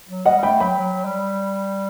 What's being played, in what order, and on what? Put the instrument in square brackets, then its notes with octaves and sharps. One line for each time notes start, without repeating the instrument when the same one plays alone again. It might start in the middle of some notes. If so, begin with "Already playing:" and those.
[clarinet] F#3
[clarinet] G3 [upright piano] D#5 F#5
[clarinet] G3
[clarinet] A3 [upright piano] G5 B5
[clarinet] F#3 [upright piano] G5 B5
[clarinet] F#3
G3